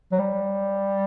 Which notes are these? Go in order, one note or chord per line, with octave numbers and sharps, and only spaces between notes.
F#3
G3